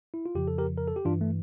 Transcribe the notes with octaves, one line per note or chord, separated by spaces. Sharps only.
E4
F4
F2 C#3 F3 G4
A4
G4 A#4
A#4
A4
G4
G2 E3 D4 F4
A3